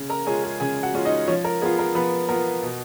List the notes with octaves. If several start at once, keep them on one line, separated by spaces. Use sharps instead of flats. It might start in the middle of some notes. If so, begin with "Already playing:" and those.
Already playing: C#3
A#4 A#5
G#3 C#4 F4 G#4 G#5
G#4 G#5
C#3 G#4 G#5
F#4 F#5
G#3 C#4 F4
D#4 D#5
F3 C#4 C#5
A#4
B3 F4 G#4
A#4
F3 B3 B4
B3 F4 A#4
B2